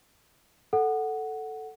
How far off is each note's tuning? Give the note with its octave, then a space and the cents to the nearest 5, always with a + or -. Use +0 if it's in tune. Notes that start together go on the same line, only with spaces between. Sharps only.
A4 +0 F#5 +0